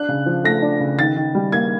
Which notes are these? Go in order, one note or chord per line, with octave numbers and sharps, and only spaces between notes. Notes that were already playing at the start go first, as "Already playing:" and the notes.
Already playing: D4 F#6
C#3
F3
A3 A#6
D4
C#3
D#3 A6
D#3
G3
A#3 G#6